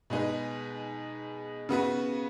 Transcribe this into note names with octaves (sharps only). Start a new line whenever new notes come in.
B2 G#3 D#4 G#4 B4
C#3 B3 F#4 B4